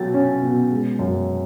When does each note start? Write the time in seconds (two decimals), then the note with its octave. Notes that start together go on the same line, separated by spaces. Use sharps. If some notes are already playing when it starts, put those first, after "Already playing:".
Already playing: B2 F#3 A6
0.14 C#4
0.42 B2
0.71 G#3
0.99 F#2